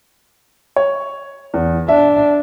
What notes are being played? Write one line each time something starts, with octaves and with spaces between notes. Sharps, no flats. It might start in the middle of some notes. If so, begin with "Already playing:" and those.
C#5
E2
D4 E5